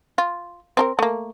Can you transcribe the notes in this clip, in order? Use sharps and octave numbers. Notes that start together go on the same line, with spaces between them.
F4
C4 A4 A#4
A3 A#3